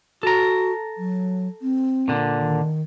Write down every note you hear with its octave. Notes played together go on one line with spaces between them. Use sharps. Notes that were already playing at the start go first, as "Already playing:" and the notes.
F#4 A4 A#5
F#3
C4
A#2 D3
D#3